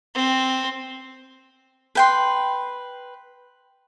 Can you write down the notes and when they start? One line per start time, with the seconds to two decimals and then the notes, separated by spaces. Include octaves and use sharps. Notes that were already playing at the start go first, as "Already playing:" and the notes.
0.15 C4
1.95 B4 G5 C6